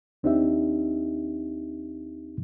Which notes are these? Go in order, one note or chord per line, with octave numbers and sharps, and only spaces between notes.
D#2 C4 D4 D#4 G4 E5